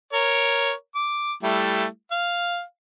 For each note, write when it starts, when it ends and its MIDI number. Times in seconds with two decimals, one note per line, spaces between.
0.13 0.72 70
0.13 0.72 73
0.95 1.33 86
1.43 1.85 55
1.43 1.85 57
1.43 1.85 64
2.11 2.62 77